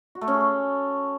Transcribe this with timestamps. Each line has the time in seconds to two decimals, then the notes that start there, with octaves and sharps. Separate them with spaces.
0.15 F#4
0.21 A3
0.28 C#4
0.34 G#4
0.40 A4